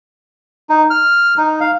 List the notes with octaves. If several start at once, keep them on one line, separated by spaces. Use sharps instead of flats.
D#4
F6
D#4
F5